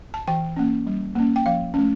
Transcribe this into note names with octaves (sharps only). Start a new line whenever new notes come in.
A5
E3 G5
A#3 C#4
G3
A#3 C#4
G5
F3 F5
A3 C#4